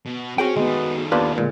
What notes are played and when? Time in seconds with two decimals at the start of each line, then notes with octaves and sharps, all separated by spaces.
0.06 B2
0.38 C4 C#4 F#4 G#4 G5
0.57 D#3 G#3 A3 B3
1.12 D#2 B3 D4 F4 B4
1.38 A#2 G#3